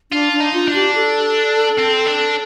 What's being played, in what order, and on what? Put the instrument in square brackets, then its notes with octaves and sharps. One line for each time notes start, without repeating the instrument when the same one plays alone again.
[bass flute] D4 [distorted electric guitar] F4
[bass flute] D4
[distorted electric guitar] D#4
[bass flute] F4
[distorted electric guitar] D4
[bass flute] G4
A4
[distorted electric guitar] C4
D4